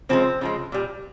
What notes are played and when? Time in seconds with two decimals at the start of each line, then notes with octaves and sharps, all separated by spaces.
0.09 C#3 F3 G#3 C4
0.41 C#3 F3 G#3
0.72 A#2 G3